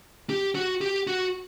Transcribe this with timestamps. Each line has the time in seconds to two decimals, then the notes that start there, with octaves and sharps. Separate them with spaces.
0.30 G4
0.55 F#4
0.81 G4
1.07 F#4